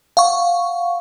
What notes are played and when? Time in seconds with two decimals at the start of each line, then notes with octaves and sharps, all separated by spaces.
0.17 F5 F#5 C#6